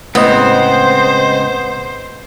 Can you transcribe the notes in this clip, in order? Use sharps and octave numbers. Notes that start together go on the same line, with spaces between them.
A2 C#3 G#3 B3 C4 C5 D#5